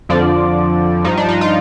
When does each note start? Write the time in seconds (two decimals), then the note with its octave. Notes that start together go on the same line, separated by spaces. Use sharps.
0.09 F2 D3 F3 D5
1.04 G2 F3 D#4
1.17 D4
1.29 D#4
1.41 F4